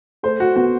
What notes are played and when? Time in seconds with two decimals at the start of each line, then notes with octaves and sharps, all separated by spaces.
0.23 A3 C5
0.40 F#4
0.56 B3 F#4